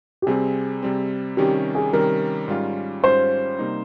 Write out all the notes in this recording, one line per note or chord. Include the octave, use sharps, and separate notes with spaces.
G4
C3 G3 C4 G#4
C3 G3 C4
C3 D#3 G3 C#4 G4
G#4
C3 D#3 G3 C#4 A#4
G#2 G3 C#4 F4
G#2 G3 C#4 F4 C5
C3 G3 A#3 D#4